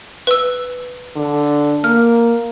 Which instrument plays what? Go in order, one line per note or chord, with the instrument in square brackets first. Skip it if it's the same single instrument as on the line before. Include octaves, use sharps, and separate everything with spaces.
[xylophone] B4 E6
[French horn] D3
[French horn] A#3 [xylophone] F6